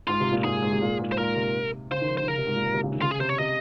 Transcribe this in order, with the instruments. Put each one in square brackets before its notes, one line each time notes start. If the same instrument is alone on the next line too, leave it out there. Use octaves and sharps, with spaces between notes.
[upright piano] G#2 [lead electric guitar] F4
[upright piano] C3
A#2
[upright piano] G#2 [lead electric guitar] G#4
[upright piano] G#2
C3
A#2
G#2
[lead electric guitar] C5
[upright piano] A#2 [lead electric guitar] A#4
[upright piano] C3
[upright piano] C#3 [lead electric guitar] C5
[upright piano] D#3
F3
[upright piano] D#3 [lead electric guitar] C5
[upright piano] C#3 [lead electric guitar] A#4
[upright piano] C3
G#2
A#2
G#2
C3
C#3
D#3
[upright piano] C#3 [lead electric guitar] F4
[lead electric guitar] G#4
[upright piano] C3 [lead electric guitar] C5
[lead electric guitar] C#5
[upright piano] C3 [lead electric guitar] D#5